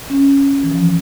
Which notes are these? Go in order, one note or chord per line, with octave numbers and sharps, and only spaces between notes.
C#4
E3
F3